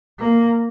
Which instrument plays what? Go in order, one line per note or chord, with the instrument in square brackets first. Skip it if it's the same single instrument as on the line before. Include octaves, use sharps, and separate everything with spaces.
[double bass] A#3